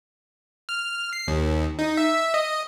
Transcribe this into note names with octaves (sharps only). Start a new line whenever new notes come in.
F6
C7
D#2
D#4
E5
D#5